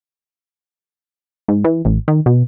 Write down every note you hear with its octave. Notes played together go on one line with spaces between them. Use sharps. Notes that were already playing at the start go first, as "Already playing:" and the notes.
G#2
E3
A1
D#3
B2